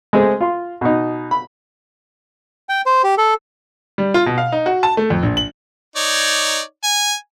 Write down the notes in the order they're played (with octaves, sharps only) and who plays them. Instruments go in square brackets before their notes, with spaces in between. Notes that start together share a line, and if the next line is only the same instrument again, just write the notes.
[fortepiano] G#3 A3 C4 G#4
F4 C6
B2 D#4
B5
[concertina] G5
C5
G4
A4
[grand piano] G3
F4
B2
F5
D#4
F#4
A5
A3
F2
A#1
F#7
[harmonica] D#4 C#5 D5
G#5